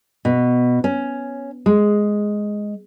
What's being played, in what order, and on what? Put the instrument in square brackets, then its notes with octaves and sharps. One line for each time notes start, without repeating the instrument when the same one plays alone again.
[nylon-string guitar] B2
C#4
G#3